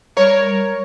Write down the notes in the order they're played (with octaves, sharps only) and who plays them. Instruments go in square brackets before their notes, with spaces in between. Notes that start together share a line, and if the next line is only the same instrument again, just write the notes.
[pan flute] G3 [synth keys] A#4 C#5